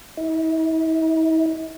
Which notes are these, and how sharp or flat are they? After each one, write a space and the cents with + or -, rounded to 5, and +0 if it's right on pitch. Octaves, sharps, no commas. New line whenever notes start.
E4 -45